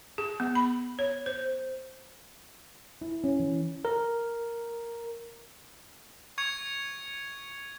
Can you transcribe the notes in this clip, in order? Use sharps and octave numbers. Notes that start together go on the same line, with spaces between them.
G#4
B3
B5
C#5
C5
E4
C#4
E3
A#4
C#6 G#6 C#7 F7